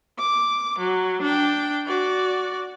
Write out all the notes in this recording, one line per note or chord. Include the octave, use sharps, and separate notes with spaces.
D6
F#3
D4 G5
F#4 D5